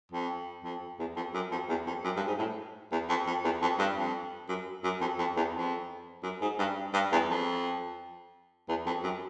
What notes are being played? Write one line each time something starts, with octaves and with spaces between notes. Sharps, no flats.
F2
F2
E2
F2
F#2
F2
E2
F2
F#2
G2
G#2
A2
E2
F2
F2
E2
F2
G2
F2
F#2
F#2
F2
F2
E2
F2
F#2
G#2
G2
G2
E2
F2
E2
F2
F#2